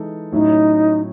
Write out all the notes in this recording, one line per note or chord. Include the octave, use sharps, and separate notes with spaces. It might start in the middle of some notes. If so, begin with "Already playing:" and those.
Already playing: E3 G#3 D#4 A4
A2 F#3 C#4 D#4 E4